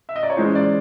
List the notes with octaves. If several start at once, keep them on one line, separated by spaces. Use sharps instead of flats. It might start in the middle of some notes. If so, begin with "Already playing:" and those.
E5
D#5
D5
C#5
E3 G#3 C#4 C5
D5